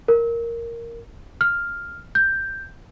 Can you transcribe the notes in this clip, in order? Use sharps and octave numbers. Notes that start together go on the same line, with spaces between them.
A#4
F6
G6